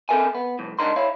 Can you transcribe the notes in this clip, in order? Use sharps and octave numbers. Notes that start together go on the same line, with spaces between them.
C4 A4 A#4 E5 G#5
B3
C2 F2 A2
C#2 D4 D#4 A#4 C6
E4 C#5 F5